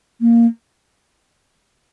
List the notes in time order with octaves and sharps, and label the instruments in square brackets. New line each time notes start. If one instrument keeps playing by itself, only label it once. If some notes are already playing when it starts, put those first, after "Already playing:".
[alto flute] A#3